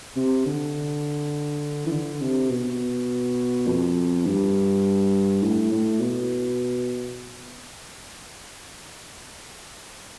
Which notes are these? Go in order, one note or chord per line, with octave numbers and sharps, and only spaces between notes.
C3
D3
E3
D3
C3
B2
F2
G2
A2
A2
B2